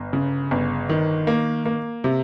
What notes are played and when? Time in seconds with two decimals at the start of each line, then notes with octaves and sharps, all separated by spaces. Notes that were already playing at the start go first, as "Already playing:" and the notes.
Already playing: G1
0.13 C#3
0.51 G1
0.89 D#3
1.27 A#3
1.66 A#3
2.04 C3